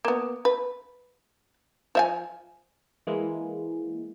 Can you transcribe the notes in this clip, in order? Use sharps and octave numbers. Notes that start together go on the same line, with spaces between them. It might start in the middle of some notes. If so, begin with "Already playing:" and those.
A#3 B3
B4
F3 E5 G#5
E3 G#3 A#3